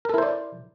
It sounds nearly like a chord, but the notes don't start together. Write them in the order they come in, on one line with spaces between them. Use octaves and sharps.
A#4 A4 E4 C5 D5